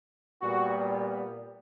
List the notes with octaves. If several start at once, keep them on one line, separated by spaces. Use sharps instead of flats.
A#2 G3 B3 F#4